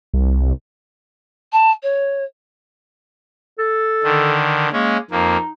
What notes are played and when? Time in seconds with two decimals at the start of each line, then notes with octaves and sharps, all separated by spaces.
0.14 C2
1.52 A5
1.83 C#5
3.58 A4
4.04 D3 D#3
4.73 G#3 A#3 C#4
5.11 F2 A#3 D#4